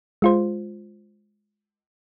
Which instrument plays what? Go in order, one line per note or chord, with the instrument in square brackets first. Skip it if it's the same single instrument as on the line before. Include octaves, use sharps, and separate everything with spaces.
[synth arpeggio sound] G#3 F4 C5